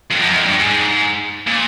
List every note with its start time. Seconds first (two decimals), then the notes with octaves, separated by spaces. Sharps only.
0.11 F2
0.21 F#2
0.33 F2
0.46 G2
0.59 G#2
1.47 A#2